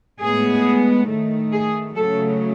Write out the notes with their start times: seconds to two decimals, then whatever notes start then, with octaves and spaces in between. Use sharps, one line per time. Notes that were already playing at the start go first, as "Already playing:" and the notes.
0.21 A2 G#3 B3 G#4
1.09 D#3 A3
1.52 G#4
1.96 C#3 F#3 A3 A4